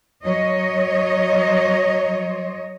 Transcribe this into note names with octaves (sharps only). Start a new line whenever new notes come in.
F#3 C#5 D#5